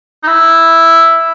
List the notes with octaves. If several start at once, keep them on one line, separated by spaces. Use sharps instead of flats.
D#4
E4